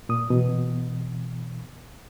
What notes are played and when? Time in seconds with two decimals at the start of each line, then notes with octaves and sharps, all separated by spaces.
0.09 A#2 D#6
0.30 B2 E3